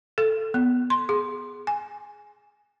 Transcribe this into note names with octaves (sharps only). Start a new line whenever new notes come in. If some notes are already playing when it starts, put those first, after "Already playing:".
A4
B3
C6
G#4
G#5